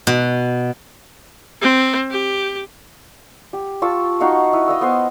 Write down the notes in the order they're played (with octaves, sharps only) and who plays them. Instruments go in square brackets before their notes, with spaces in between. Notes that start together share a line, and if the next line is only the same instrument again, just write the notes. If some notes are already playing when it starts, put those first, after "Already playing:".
[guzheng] B2
[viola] C4
G4
[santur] G4
F4 A5 C#6 E6
D#4 F#4 F5 C#6
E4 B4 D#6
D#5 F5 E6
B3 C5 F5